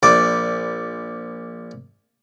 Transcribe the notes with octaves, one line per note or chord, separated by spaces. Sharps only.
A#1 D5